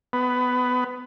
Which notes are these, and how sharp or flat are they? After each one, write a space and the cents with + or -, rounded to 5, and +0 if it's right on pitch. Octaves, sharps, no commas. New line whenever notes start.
B3 +15